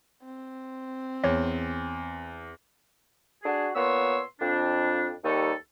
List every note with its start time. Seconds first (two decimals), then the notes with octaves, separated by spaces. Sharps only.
0.25 C4
1.24 E2 C#5
3.43 D4 F#4 G#4
3.76 A#2 B3 C#5 C6 E6
4.40 F2 D4
5.25 D#2 G3 D#4 A4 C#6